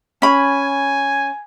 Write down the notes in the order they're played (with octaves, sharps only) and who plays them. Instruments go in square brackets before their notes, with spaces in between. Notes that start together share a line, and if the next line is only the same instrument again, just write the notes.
[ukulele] C#4 B5 [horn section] G#5